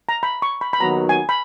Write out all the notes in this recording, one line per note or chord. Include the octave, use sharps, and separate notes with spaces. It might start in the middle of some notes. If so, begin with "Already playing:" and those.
A#5
B5
C#6
B5
B5
D#2 D#3 F#3 B3 F#4 A#5
G#5
B5